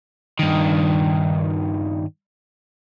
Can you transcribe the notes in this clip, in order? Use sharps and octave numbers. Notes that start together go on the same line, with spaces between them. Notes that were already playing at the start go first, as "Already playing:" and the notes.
G2 D#3